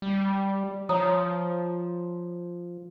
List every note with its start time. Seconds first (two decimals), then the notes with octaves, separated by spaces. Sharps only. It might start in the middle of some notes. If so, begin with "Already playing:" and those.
0.02 G3
0.89 F3 C#5 A#5 D#6